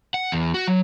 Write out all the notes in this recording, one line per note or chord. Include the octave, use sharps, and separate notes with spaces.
F#5
E2
F#4
F#3